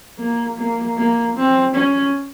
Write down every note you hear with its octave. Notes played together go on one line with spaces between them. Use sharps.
A#3
A#3
A#3
C4
C#4